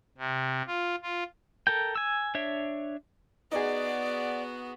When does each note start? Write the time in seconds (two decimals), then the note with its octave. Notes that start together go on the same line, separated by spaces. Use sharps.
0.18 C3
0.68 F4
1.03 F4
1.67 A4 A#4 G5
1.96 G#5 E6
2.35 D4 C#5 E5
3.52 B3 D#4 F#4 G#4 D5